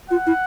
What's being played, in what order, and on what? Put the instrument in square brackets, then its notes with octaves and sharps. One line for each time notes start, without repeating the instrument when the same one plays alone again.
[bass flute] F4 [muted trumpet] F#5
[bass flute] E4